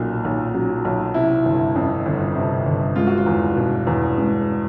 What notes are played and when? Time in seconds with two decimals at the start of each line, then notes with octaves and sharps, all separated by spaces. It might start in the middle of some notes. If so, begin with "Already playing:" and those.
Already playing: B1 A#2 F#3 D#4
0.25 B1
0.55 F#3
0.85 B1
1.14 C3 E4
1.45 G1
1.76 F2
2.06 G1
2.36 C3
2.66 G1
2.96 G#3 F4
3.07 F#4
3.18 F4
3.26 E2
3.56 B2
3.87 E2
4.18 G#3